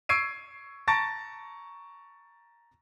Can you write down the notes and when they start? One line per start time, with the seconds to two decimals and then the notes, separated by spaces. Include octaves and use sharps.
0.09 C#6 E6 G#6 C7 D7 D#7
0.88 A5 A#5 C#6 A6 A#6 D7